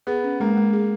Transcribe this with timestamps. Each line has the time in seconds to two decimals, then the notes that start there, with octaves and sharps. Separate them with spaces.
0.07 B3 G#4
0.24 C#4
0.40 G#3 A#3
0.57 G#3
0.73 G#4